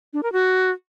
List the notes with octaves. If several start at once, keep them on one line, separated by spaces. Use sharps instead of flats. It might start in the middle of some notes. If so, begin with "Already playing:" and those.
D4
A#4
F#4